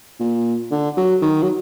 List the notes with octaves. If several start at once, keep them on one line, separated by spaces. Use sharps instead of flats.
A#2
D3
F#3
D#3
F#3